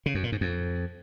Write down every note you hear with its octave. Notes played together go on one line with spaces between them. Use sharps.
C#3
F#2
A#2
G#2
F2